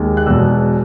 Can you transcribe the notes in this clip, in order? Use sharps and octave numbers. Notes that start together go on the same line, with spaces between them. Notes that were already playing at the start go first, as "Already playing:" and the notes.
Already playing: D#2 D#3 G#3
F#6
E1 E2 B2 E6